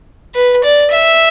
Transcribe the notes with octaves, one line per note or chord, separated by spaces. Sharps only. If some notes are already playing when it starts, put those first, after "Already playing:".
B4
D5
E5